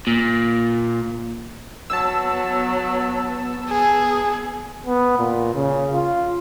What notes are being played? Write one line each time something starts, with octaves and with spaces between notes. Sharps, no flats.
A#2
F#3 B3 A5 E6
G#4
B3
A#2
C#3
F4